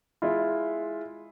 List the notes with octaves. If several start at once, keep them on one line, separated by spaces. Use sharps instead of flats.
G#3 E4 F4